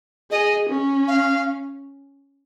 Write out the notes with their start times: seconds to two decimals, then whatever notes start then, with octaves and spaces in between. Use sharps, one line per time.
0.31 G#4 D#5
0.69 C#4
1.08 F5